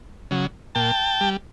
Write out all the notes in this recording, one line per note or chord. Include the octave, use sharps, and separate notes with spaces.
C#3 F#3
A#2 G5 A5
G3